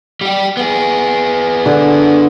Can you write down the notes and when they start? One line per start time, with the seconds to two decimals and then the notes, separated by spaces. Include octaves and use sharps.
0.21 G3 G4
0.57 B3 G#4
1.66 D3